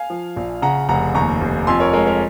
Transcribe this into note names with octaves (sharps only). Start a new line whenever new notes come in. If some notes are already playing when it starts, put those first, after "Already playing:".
Already playing: F5 G#5
F3
A#1
C#3 F#5 A#5
F1 F#5 A#5
D#2 A#5 C#6
F1
F2 G#5 C6
A#4 C#5
G#3 A#4 C#5
A#4